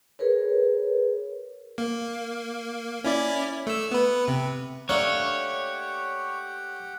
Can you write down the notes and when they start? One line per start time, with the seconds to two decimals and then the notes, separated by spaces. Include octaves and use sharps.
0.19 G#4 A#4 B4 C#5
1.78 A#3
3.04 C#4 E4 D5
3.67 A3 E6
3.91 B3 B4
4.28 C3
4.89 A3 A#3 D4 G4 C#5 F#5